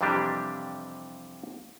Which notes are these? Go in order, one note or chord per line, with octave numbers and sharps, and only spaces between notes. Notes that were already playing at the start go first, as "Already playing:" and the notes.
F2 C3 E3 G3 D4 G4